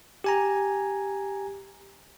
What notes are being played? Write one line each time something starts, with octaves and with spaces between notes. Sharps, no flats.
G4 G#5 A#5